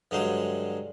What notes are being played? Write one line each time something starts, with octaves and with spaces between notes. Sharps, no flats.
G2 D3 F#3 G#3 C5 F5